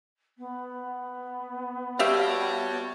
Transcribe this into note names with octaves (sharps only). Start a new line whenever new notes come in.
B3
G3 F#4 G4 C#5 E5 F5 A5